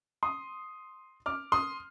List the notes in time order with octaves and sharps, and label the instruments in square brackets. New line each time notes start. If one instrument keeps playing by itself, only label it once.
[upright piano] C6 D#6
D6 F6
C6 D#6